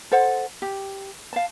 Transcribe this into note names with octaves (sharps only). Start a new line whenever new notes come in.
A4 C5 F#5
G4
F5 A5